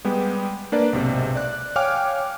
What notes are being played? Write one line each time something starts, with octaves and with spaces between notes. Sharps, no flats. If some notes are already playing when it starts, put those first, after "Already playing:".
G3 G#3 B3 G4
A#3 D4 B4 D5
B1 G#2 C3
D5 F#6
C#5 F5 G5 G#5 D6 F6